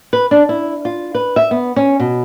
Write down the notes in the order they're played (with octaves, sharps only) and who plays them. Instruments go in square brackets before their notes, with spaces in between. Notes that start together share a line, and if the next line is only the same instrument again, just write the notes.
[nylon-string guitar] B4
D4
E4
F4
B4
E5
B3
C#4
B2